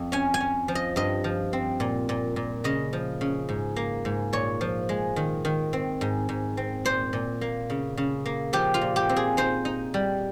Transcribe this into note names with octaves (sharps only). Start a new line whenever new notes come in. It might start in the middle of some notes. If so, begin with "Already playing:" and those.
Already playing: F2
C#4 G#5
G#5
C#4
F3
D#5
G2 D#5
F3
C4
A#2
A#2
A#2
C#3 D#5
F3
C#3
G#2
A#3
G#2
A#2 C#5
F3
G#3
D#3
D#3
C4
G#2
G#2
C4
A#2 C5
A#2
A#3
C#3
C#3
A#3
F3 G4
F4
A#2
G4
C4
G#4
D#4 C5
D#4
G3